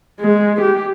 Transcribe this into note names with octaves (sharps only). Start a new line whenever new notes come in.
G#3
G4